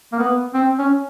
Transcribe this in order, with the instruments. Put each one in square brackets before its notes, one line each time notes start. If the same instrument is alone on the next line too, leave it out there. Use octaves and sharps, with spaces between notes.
[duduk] A#3
B3
C4
C#4